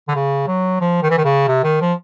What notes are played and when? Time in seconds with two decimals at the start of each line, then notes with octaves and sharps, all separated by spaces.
0.08 D3
0.15 C#3
0.47 F#3
0.81 F3
1.03 D#3
1.10 E3
1.18 D#3
1.25 C#3
1.48 C3
1.63 D#3
1.81 F3